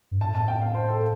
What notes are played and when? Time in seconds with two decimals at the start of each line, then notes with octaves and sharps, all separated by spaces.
0.11 G2
0.20 A2 A5
0.35 A5
0.48 G5
0.61 F5
0.75 C5
0.88 A4